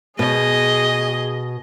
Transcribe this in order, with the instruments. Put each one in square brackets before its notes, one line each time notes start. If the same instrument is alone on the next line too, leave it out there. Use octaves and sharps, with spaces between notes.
[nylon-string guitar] B2 [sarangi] G#4 [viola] D#5